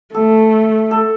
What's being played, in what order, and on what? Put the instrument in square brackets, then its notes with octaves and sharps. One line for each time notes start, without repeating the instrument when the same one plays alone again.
[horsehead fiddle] A3 [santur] A4
[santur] A4